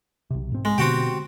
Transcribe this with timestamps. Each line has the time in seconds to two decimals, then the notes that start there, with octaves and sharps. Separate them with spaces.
0.31 B1 C3
0.52 G#2 C4
0.65 G#3
0.78 B2 D3 B3 C4 F#4 G4